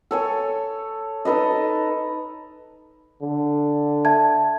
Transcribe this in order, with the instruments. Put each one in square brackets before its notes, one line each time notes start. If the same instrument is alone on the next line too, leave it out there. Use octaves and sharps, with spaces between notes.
[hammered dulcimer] A4 C#5 G#5
D#4 A4 B4 D#5
[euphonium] D3
[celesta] E5 A5 G#6